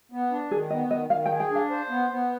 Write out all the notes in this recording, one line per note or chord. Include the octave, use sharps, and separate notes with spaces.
B3
D4
D#3 G#4
B3 D#5
D#3 D#5
D#3 F5
G5
G#4
G5
D4
F5
C5
B3
B3